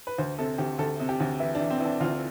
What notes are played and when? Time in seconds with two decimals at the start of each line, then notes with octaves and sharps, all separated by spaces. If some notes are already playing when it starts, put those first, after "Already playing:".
0.07 B4
0.18 D2 C5
0.38 C3 A4
0.58 D2 G4
0.78 D2 A4
1.00 C3
1.09 G4
1.20 D2
1.40 E3 E4
1.55 D4
1.60 E3
1.70 C4
1.80 E3
1.85 D4
2.00 D2 F4